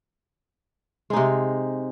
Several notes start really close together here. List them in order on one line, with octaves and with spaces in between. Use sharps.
G#3 D#4 C3